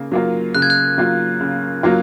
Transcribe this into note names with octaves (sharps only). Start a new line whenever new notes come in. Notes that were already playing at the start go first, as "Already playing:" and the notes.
Already playing: C#3 A#3
F#3 A#3 F4
C#3 F#6
G#6
F#6
F#3 A#3 F4
C#3
F#3 A#3 F4